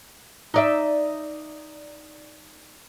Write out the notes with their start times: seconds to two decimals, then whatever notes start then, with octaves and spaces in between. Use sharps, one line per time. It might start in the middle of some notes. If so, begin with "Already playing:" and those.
0.54 D#4 D5 E5